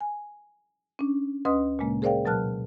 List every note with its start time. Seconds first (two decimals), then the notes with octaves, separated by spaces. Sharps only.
0.01 G#5
0.99 C#4 D4
1.45 D2 C#4 B4 D#5 C6 D#6
1.79 A#2 C#3 G#3 A#3
2.02 G#4 A#4 C5 D5 F5 G5
2.25 B2 F#3 A#4 A5 F6 F#6